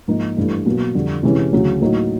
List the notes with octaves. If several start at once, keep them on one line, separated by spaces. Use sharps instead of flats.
G#2 F3 A#3 D#4
G2 E3 A3
B2 F#3 A#3
F2 D3 G3
C3 E3 G#3 C#4
D2 C#3 F#3
A2 F#3 A#3 D#4